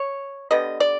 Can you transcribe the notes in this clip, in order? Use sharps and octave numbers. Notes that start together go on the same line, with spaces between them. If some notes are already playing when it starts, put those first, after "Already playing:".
Already playing: C#5
D3 G3 B3 D#5
D5